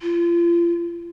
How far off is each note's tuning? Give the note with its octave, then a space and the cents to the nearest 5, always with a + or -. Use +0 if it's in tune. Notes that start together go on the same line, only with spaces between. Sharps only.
F4 -35